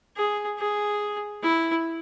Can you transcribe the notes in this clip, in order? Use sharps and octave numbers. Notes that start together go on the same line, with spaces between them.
G#4
G#4
E4